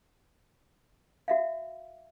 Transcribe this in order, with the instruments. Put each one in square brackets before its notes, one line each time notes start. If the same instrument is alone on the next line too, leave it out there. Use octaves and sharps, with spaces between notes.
[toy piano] F#4 E5 F5